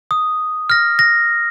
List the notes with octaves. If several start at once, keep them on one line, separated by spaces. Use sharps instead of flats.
D#6
F6 A#6
A#6